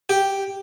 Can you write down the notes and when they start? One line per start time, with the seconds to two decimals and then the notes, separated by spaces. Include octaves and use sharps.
0.09 G4